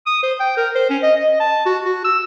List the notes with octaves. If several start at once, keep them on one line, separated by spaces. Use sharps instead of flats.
D#6
C5
G5
A#4
C5
C#4
D#5
D#5
A5
F#4
F#4
E6